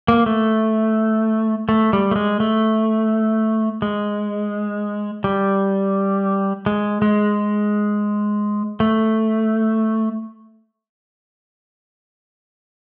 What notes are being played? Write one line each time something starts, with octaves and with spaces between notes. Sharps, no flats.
A#3
A3
A3
G3
A3
G#3
A3
G#3
G3
G#3
G#3
A3